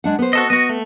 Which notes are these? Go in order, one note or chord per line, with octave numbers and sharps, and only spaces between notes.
G#3 D4 F#5
B3 C5
F#4 A4 D#5
B3 F#4 D#5
A3